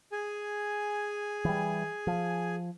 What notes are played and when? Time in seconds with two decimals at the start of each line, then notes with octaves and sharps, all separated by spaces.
0.12 G#4 G#5
1.45 E3 G3
2.07 F3